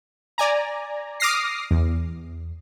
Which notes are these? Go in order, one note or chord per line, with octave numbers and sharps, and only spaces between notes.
D5 G#5 A#5
D6 D#6 F6 A#6 C7
E2